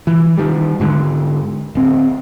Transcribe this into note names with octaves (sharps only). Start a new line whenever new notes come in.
E3
D#3 G3
G#2 D3
D1 C4